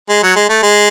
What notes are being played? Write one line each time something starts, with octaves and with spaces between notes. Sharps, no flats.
G#3
F#3
G#3
A3
G#3